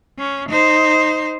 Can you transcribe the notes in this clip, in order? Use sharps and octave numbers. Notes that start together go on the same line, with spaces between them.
C#4
D#4 C5